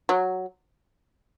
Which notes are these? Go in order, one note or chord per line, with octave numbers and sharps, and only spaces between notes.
F#3